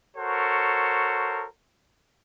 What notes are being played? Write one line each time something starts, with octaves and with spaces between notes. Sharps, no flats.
F#4 A4 A#4 C5 C#5